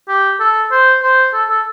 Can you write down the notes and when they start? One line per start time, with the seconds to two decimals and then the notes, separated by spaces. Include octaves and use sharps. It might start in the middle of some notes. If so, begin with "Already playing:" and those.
0.08 G4
0.40 A4
0.72 C5
1.02 C5
1.33 A4
1.49 A4